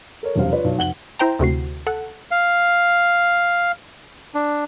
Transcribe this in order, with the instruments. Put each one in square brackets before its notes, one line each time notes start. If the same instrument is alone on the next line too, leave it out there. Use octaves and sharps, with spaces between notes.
[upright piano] A4 A#4 C#5
E1 C3 F#3 C5 F5
F4 B4 C#5 D5
B1
F1 F#5 F#7 G7
[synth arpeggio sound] E4 C5 G5 A#5
D2 C3 F#4 C7
A4 F#5
[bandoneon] F5
D4